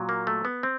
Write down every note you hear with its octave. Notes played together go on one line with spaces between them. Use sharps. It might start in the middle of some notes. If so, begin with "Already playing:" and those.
Already playing: A#2 F#3
A#3
A3
B3
C4